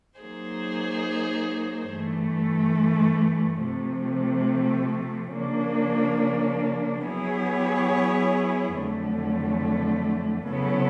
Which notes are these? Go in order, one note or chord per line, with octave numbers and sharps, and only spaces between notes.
F#3 A#3 D#4 G#4 C5
G2 E3 A3
C3 F3 A3 C4
C#3 F3 A#3 D4
F#3 B3 E4 G#4 C#5
F2 D3 F#3 A3
C#3 F#3 B3 E4 A4